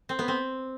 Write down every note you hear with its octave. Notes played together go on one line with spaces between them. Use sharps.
C4
B3
C4